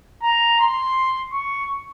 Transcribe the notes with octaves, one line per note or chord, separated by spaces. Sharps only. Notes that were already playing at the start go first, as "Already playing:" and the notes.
A#5
C6
C#6